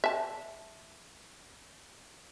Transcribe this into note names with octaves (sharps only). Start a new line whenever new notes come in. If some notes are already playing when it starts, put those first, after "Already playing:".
E5 A5